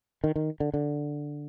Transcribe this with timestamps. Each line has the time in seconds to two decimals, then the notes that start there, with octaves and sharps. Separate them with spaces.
0.24 D#3
0.36 D#3
0.60 D3
0.74 D3